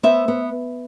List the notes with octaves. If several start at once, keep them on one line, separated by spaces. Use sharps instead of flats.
B3 C5 E5
B3